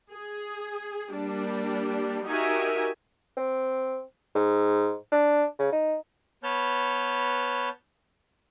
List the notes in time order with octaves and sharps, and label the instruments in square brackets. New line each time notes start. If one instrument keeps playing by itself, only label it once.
[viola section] G#4
G3 A#3 D4
D#4 F#4 G4 A#4 E5 G#5
[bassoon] C4
G#2
D4
C#3
D#4
[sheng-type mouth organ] B3 B4 C#5 A5 F6 G6